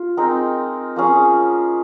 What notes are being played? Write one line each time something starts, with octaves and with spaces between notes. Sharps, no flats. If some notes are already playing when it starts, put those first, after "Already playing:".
Already playing: F4
G#3 C4 D#4 A#4
F3 A#3 C#4 G#4